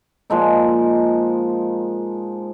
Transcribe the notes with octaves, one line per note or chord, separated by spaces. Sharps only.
A#2 F3 G#3 D#4